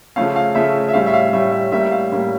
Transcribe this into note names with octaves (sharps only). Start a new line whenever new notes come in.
C#3 F3 A3 C#4 F5
F5
C#3 F3 A3 C#4 E5
E5
A2 G3 C#4 F5
E5
F5
A2 G3 C#4 E5
E5
A2 G3 A#3 C#4 E5
F5
A2 G3 A#3 C#4